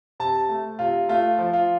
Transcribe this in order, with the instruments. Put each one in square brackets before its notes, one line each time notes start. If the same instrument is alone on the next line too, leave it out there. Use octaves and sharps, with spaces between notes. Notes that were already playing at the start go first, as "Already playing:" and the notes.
[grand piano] C3 A5
A3
C3 F4
A3 F4
F3
F4